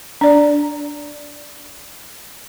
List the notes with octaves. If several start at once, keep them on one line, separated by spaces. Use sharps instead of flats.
D4 D5